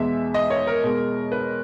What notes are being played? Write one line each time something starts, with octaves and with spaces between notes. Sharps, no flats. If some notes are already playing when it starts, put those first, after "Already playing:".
Already playing: E2 B2 G#3 E5
D#5
C#5
A#4
B2 G#3
B4